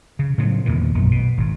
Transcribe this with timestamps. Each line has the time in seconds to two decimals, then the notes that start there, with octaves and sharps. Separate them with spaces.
0.19 C#3
0.38 A2 C#3 F3 F#3
0.66 E2 A#2 D#3 E3
0.94 A#1 F#2 B2 A3
1.11 B2
1.37 G#1 G#2